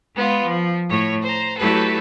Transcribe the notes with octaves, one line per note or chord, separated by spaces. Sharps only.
G#3 B3 F4
F3
A2 C#5
C5 A#5
F#3 A3 E4 G4 A4 B4